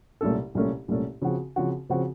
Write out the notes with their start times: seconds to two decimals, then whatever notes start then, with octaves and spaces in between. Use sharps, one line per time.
0.21 C2 A#2 A3 C#4 A4
0.55 C2 A#2 A3 C#4 A4
0.88 C2 A#2 A3 C#4 A4
1.22 C#3 F3 C4 F#4
1.56 C#3 F3 C4 F#4
1.90 C#3 F3 C4 F#4